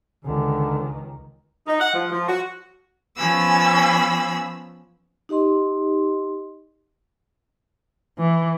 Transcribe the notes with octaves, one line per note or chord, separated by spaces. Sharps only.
C#2 D3 D#3
D#4
F#5
F3
F3
F#4
F3 B3 C#4 B5 E6
D#4 G4 D#5 C6
E3